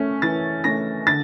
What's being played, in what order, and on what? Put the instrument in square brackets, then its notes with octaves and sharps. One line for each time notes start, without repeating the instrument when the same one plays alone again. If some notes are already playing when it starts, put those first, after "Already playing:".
Already playing: [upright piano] A3 C#4
E3 A6
A3 C#4 A#6
D3 A6